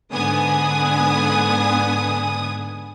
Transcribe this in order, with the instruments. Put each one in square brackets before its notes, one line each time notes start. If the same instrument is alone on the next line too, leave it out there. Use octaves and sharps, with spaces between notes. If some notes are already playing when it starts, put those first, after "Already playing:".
[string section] G#2 D3 B3 G#5 D#6